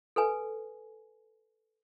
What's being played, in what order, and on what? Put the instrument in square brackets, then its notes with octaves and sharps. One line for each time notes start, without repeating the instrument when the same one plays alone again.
[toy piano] A4 B4 G#5